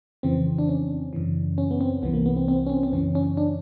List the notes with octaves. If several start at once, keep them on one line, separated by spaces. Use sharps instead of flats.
F2 C#3 E3 C4
D4
C#4
F#2 C#3 E3
C#4
B3
C4
C2 C3 E3 B3
A#3
B3
C4
C4
C#4
C4
C4
F#2 C#3 E3 C#4
C#4
D4